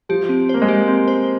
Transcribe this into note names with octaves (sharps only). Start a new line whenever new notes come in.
F3 G4
C4
A#3 C5
G#3
G4
C4
C5